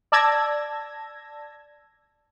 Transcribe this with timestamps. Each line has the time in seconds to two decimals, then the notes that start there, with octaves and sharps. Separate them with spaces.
0.12 D5 A5 E6 G#6 A#6